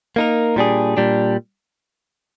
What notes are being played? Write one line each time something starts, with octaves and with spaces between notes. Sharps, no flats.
A#3 D#4 A#4
A#2 G3 D4 G#4
A#2 G3 D4